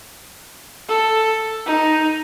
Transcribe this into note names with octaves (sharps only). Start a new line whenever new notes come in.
A4
D#4